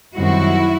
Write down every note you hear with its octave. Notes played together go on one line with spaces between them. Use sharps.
F#2 D#3 G3 C4 E4 F#4